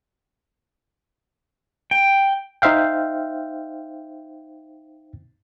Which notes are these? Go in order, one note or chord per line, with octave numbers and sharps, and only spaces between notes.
G5
D#4 C5 E5 F5 G5